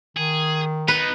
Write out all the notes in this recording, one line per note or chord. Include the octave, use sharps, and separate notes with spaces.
D#3 G#4
B3 D#4 B4